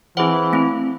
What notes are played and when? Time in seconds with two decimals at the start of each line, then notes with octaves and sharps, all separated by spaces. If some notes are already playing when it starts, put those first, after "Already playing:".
0.17 E3 C4 E4 G#4 C5 F#5
0.53 A3 C4 E4